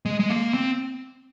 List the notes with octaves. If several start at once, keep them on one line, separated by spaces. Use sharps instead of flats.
G#3
G#3
A#3
C4